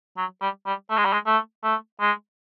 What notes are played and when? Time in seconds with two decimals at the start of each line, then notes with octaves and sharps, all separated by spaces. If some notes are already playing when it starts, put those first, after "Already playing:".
0.17 F#3
0.41 G3
0.66 G3
0.90 A3
0.98 G#3
1.05 G3
1.13 G#3
1.26 A3
1.64 A3
2.00 G#3